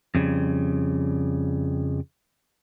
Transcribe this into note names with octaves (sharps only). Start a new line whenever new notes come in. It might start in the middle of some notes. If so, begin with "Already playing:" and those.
F2 C#3 G3